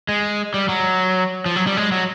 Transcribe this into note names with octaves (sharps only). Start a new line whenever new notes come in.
G#3
G3
F#3
F3
F#3
G3
G#3
F#3